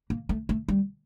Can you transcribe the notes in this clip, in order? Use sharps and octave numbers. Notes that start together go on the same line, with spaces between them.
A#3
A3
A3
G3